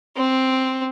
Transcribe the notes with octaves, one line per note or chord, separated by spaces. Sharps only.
C4